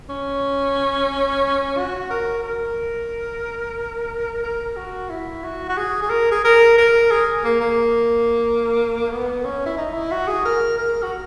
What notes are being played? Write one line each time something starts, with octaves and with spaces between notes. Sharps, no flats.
C#4
F#4
A#4
A#4
A#4
F#4
E4
F#4
F#4
G#4
G#4
A#4
G#4
A#4
A#4
G#4
A#3
A#3
B3
C#4
E4
D#4
E4
F#4
G#4
A#4
A#4
F#4